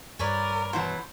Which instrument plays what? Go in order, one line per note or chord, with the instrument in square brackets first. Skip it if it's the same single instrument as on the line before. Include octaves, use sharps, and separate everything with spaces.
[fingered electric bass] G2 G3 [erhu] A#4 [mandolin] B4 C#5 D5
[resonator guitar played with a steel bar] B2 E3 F#3 [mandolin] C5